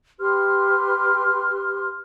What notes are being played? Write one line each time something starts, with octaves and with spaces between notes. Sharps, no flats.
G4 B4 C6 F6